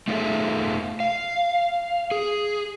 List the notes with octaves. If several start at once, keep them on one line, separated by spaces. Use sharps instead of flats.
A3 D#4 F4 G#4 A4 E5
F5
G#4